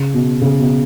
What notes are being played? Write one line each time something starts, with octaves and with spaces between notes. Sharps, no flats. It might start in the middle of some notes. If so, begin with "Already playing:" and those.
Already playing: C#3
B2
C#3
B2